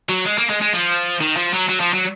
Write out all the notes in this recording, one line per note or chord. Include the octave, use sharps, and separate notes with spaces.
F#3
G#3
A#3
G#3
G#3
F3
D#3
F3
F#3
F#3
F3
F#3